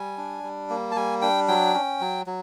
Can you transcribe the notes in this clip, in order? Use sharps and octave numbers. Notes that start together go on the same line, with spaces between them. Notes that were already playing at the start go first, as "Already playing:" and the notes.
Already playing: G3 G#5
D4
G3
A#3
A5
G3 G#5
D4 G5
F#3 G5
C#4
F#3
F#3